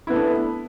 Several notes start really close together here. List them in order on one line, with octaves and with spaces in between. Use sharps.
E4 B3 A3 D4